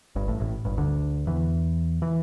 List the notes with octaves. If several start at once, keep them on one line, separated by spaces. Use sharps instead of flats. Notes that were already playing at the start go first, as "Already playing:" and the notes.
G1 G2
A1 A2
A1 A2
G1 G2
D2 D3
E2 E3
E3